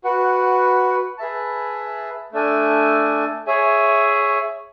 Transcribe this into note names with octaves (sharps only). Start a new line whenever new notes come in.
F#4 B4 F#5
G#4 B4 E5 A5
A3 D4 A4 D5 G#5
G#4 C#5 E5 G#5